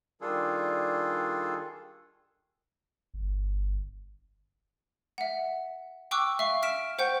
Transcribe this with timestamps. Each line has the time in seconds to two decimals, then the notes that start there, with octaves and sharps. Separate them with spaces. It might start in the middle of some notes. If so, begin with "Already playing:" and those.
0.21 D#3 G3 D4 F4 G#4 A4
3.14 G1
5.18 E5 F#5
6.11 G5 C#6 D6 E6 F#6
6.39 E5 F5 C#6
6.63 F6 B6 D7 E7
6.99 C5 F#5 G5 C#6 G6